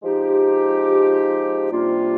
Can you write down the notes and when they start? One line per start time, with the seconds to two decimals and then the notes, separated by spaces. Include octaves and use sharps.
0.02 F3 G#3 D#4 G4
1.71 C3 G3 A#3 D4 F4